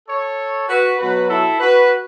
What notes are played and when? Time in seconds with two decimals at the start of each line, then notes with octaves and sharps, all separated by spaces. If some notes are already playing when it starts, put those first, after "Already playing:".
0.09 A4 C#5
0.69 F#4 B4
0.99 B2 F#3 F#4 B4
1.29 E4 A4
1.60 F#4 B4